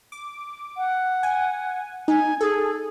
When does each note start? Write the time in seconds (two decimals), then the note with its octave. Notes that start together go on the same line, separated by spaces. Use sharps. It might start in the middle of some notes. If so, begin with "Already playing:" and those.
0.12 D6
0.77 F#5
1.23 G#5
2.08 D#4 G#5
2.41 G#4 A4